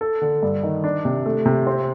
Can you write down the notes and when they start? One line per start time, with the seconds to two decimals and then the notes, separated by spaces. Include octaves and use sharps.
0.01 A4
0.21 D3
0.43 G2
0.63 D#3
0.84 D4
1.05 C3
1.26 A3
1.46 C3
1.67 C4